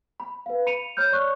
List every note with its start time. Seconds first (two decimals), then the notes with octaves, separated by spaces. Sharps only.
0.20 B5
0.46 B4 F5
0.66 B5 C#7 D#7 F7
0.97 C#5 B5 F6 G6
1.12 C#5 D5 C#6 F#6